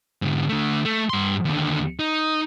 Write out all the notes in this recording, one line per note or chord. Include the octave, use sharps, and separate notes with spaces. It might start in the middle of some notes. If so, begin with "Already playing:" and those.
G#2 D3
D3 A3
A3
G2 C6
D#2 D3
D#4